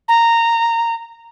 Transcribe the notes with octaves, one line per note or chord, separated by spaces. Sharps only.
A#5